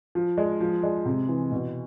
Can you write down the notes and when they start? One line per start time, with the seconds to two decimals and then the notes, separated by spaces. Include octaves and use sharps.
0.15 F3
0.38 G#3
0.61 F3
0.83 G#3
1.06 C3
1.28 E3
1.52 B2